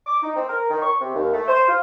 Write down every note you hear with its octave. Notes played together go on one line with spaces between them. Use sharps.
D6
D#4
C4
A#4
D#3
C#6
C3
D#2
A3
C5
F4